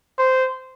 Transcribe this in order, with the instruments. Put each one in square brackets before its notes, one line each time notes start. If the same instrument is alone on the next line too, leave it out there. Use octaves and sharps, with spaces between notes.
[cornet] C5